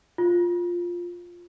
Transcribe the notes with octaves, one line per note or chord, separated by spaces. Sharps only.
F4